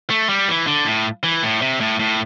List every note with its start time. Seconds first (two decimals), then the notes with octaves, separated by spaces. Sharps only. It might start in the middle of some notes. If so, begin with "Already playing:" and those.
0.10 A3
0.29 G3
0.48 E3
0.67 D3
0.86 A2
1.23 E3
1.43 A2
1.62 C3
1.81 A2
2.00 A2